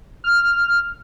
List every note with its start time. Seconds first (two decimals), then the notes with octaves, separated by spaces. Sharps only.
0.24 F6